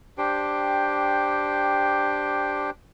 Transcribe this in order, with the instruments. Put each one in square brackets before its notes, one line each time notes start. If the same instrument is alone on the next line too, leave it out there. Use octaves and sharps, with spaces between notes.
[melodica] D4 G4 C5 G5